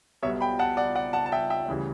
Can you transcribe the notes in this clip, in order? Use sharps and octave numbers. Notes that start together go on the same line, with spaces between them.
B1 B2 G3 B3 C#5 E5
G5 B5
F#5 A5
D5 F#5
D5 F#5
F#5 A5
A5
E5 G5
E5 G5
D2 C#3 E3 G3